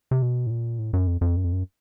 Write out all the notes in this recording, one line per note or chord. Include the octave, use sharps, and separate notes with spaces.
C3
B2
A2
A#2
A2
F#2
F2
F2
F#2
F2
F#2